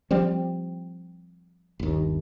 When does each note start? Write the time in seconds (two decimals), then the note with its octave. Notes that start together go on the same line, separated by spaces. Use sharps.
0.11 F3 G3 C4
1.79 G1 D#2